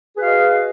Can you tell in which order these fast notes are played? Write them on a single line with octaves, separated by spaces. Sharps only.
G#4 B4 F#4 F5 D#5